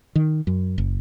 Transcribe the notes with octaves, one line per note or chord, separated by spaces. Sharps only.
D#3
F#2
F#1